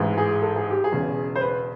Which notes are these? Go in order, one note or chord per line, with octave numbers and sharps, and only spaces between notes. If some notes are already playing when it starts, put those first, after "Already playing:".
Already playing: A1 G#2 E3 G#3
G#4
A4
G#4
G4
G#4
E1 E2 C#3
C5
B4